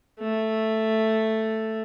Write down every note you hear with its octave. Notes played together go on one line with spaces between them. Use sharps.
A3